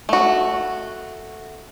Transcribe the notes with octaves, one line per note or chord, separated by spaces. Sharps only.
A3 F#4